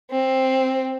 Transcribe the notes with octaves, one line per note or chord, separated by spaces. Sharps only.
C4